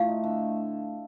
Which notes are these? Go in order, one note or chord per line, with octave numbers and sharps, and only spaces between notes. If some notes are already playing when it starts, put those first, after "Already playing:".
Already playing: A2 A3 F4 F5
D#4
D3
D3